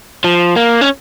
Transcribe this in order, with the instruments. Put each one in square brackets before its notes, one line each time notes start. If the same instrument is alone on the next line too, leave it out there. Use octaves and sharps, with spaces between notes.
[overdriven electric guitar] F3
A#3
C#4